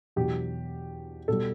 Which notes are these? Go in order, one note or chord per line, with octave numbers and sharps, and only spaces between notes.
E2 B2 F#3 G4
B2 G3 A4